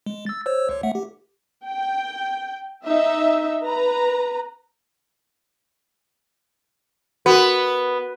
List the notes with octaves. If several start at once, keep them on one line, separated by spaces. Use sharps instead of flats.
G#3
E6 A6
C5 C#5 E6
C#2 C#5
A3 E5 F#5
G4
G5
D#4 E5
B4 A#5
B3 F#4 A#4